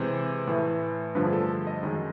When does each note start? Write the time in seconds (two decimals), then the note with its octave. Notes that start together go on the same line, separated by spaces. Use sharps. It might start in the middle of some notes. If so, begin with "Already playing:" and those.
Already playing: C3 E3 G#3 C5
0.47 A2 E3 A3
1.15 G2 D3 F3 A3 B4
1.25 G#4
1.33 A4
1.67 D#5
1.83 F#2 D#3 G#3